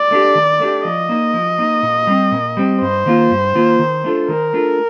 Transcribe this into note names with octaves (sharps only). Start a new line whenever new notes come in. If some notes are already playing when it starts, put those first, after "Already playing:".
Already playing: D5
A3 D4 G4
D#3
A3 D4 G4
F3 D#5
A#3 D#4
F3
A#3 D#4
A#2
G3 C4
A#2
G3 C4
G2 C5
D#3 A#3 F4
G2
D#3 A#3 F4
D#3
A3 D4 F4 A4
D#3 A#4
A3 D4 F4 A4